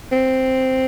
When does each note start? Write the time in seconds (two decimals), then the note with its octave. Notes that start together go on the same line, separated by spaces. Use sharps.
0.12 C4